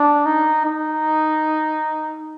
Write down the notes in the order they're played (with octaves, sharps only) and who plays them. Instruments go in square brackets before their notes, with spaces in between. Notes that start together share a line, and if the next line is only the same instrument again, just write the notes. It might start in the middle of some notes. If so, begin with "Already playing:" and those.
Already playing: [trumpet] D4
D#4
D#4